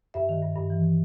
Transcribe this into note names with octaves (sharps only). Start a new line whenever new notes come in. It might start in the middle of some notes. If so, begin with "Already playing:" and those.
G2 E5
D#3
G2
G2
E3